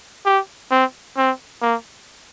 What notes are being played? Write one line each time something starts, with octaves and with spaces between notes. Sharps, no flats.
G4
C4
C4
A#3